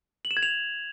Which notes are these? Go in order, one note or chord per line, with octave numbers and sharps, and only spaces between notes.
F#7
E7
G#6
F7